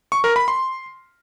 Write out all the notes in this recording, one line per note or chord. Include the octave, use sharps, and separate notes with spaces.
C#6
A#4
B5
C6